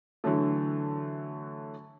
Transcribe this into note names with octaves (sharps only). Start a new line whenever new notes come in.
D3 E3 F#3 A3